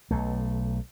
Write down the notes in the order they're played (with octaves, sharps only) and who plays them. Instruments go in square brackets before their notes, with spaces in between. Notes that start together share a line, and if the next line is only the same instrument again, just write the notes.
[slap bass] B1 A3